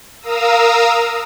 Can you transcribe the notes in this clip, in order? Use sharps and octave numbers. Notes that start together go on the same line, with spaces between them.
A#4 F5 A#5 D#6 E6